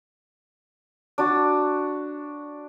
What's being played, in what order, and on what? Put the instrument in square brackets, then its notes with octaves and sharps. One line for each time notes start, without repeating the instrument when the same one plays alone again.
[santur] D4 F#4